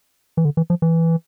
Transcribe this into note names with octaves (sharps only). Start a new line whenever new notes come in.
E3
D3
E3
F3
E3